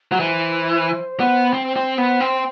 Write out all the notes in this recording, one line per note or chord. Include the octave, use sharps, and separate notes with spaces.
F#3
E3 C5
B3
C4
C4
B3
C4